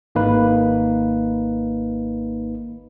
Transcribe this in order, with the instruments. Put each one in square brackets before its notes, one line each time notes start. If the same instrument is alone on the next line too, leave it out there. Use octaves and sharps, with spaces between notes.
[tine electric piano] G#1 A#3 D#4 B4